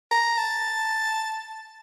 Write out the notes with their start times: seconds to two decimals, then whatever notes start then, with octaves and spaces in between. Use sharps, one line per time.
0.11 A#5
0.38 A5